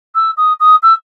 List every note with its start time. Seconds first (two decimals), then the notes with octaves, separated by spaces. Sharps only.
0.15 E6
0.37 D#6
0.60 D#6
0.83 E6